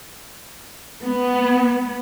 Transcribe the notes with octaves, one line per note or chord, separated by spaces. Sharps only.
B3